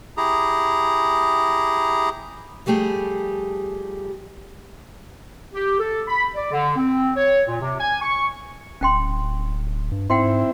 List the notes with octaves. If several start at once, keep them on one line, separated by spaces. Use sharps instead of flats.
E4 G4 G#4 A#5
F3 G3 A3 G4 G#4
G4
A4
B5
D5
D3
C4
C#5
A#2
C3
G#5
C#6
D1 C#4 G5 C6
G2
G#2 C4 E4 F#5 G5 C6